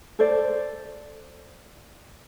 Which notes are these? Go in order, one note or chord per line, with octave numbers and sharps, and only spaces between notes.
A4 C5 D5